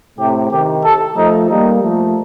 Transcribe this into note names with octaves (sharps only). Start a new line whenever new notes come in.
A2 C3 G4
C3 D#3 G4
A4
F3 A3 D#4
G3 A#3 D#4
F3 A3